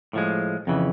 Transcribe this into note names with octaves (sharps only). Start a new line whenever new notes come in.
A2 F3 G#3
F2 C#3 E3